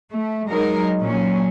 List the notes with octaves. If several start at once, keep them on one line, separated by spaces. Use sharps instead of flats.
A3
F#3 G#3 D#4 A#4
A#2 F#3 C#4